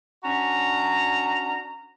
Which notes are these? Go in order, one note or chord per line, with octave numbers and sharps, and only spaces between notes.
C#4 D4 F#4 A#5